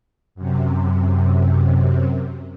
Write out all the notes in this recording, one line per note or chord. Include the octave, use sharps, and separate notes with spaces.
F#2 C3